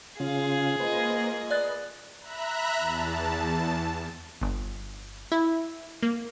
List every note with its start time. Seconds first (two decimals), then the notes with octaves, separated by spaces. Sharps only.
0.20 C#3 C#4 F4 G#4 F5
0.80 A#3 F4 B4 C5 D#5
1.51 B4 D5 D#5 F#6 A6
2.21 E5 A#5 B5 F#6
2.78 E2 A5
4.41 G1
5.32 E4
6.03 A#3